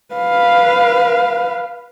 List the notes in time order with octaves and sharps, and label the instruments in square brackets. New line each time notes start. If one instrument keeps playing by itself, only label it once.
[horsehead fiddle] B4 F5